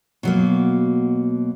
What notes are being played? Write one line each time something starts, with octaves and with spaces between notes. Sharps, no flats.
B2 F#3 A#3